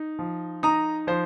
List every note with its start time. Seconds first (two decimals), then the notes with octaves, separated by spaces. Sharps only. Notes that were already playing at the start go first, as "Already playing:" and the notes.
Already playing: D#4
0.19 F3
0.63 D#4 A#5 D#6
1.07 F3 C5